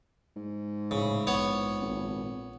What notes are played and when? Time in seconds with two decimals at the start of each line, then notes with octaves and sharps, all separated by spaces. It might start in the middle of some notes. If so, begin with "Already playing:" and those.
0.36 G#2
0.91 A2 C#3 E4
1.27 A#1 B3 C#5
1.81 G#1